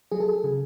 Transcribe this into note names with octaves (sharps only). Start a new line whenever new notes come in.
F#3 G#4
A4
G#4
C#3